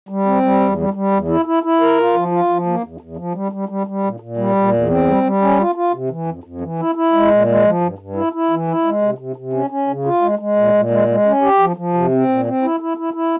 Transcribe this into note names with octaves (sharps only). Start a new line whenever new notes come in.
G3
C4
G3
E2
G3
G3
E2
E4
E4
E4
A#4
F4
F3
F4
F3
A#3
E2
E2
F3
G3
G3
G3
G3
A#2
A#2
G3
A#2
E2
C4
G3
G3
C#4
F4
F4
C3
E3
F2
F2
E3
E4
E4
G#3
A#2
G#3
F3
G2
G2
E4
E4
E3
E4
G#3
C3
C3
C3
C#4
C#4
C#3
F4
G#3
G#3
A#2
A#2
G#3
G#3
C#4
G4
F3
F3
C3
C4
A#2
C4
E4
E4
E4
E4